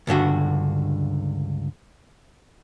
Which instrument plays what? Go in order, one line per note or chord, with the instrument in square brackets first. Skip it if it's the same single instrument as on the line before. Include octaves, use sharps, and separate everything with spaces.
[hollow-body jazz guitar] C#2 G2 D3 F#4